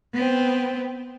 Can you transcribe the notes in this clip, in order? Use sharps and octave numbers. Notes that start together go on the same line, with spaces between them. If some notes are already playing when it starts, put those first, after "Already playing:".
B3 C4